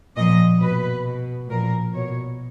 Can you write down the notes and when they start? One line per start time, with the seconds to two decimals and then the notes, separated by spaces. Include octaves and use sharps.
0.17 A#2 F3 D#5
0.61 B2 B4
1.05 B2
1.49 A#2 F3 A#4
1.94 B2 C#5